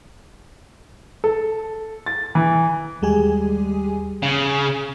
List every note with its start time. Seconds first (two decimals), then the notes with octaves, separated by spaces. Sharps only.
1.24 A4
2.06 A6
2.35 E3
3.02 D#2 G3 G#3 G4 G#4 G#5
4.22 C#3